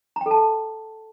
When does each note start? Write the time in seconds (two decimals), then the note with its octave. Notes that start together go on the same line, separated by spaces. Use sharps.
0.16 A#5
0.21 G5
0.26 A4
0.31 A5